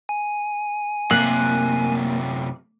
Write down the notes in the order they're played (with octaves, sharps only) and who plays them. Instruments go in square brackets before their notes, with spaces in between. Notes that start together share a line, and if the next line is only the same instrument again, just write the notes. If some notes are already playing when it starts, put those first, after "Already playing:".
[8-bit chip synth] G#5
[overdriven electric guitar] F#2 C3 [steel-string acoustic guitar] A#3 [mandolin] F#6